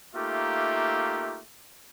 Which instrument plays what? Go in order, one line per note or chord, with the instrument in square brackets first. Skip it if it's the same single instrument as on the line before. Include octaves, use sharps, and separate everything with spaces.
[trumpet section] A3 A#3 D#4 F4 G4 E5